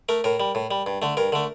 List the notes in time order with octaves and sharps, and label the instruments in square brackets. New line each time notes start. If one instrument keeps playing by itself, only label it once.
[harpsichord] A3 A#4
A2 A#4
G3
A2
G3
G2
D3 A3
G2 A#4
D3 A3